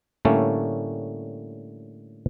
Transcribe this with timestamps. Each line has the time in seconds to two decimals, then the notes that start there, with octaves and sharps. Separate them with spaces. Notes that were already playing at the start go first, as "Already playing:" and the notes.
0.25 A2 D3 G3 A3 A#3 C#4